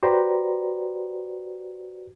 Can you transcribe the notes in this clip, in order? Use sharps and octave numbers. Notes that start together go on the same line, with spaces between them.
F#4 G4 B4 C5 D5 A#5